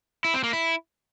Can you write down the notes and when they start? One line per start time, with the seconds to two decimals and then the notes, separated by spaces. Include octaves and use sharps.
0.25 E4
0.34 C4
0.44 A#3
0.53 E4